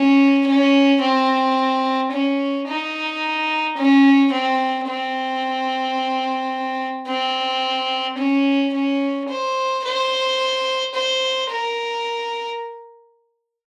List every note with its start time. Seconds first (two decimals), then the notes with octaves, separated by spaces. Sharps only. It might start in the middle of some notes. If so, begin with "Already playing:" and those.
Already playing: C#4
0.47 C#4
1.01 C4
2.12 C#4
2.67 D#4
3.77 C#4
4.32 C4
4.88 C4
7.08 C4
8.18 C#4
8.74 C#4
9.29 C5
9.85 C5
10.94 C5
11.50 A#4